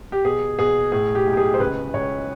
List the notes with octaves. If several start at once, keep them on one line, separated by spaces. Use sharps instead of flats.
G4
B2 G#4
B2 G#4
A2 G#4
G4
B1
G4
G#4
C5
C#2 B4
C#2 C#5